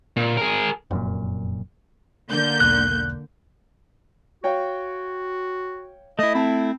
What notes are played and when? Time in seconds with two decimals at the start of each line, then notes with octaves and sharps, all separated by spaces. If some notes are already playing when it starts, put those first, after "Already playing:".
0.17 A#2
0.37 G#4 A#4
0.91 F1 F#2 A#2
2.30 D3 A#3 G6
2.60 E1 B1 F#6
4.44 F#4 C#5 F5 G5
6.19 A3 E4 D#5
6.35 C4 A5 B5